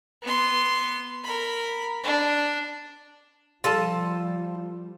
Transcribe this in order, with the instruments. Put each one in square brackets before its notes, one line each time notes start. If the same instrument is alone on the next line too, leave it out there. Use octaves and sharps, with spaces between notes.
[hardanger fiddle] B3 C6
A#4 B5
D4
[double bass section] F3 G3 [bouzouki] F4 A4 A5